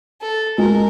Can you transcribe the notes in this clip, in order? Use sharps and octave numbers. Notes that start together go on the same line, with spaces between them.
A4
G#3 A#4